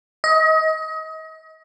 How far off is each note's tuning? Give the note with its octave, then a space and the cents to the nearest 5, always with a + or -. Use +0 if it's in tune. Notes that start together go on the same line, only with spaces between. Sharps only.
D#5 +30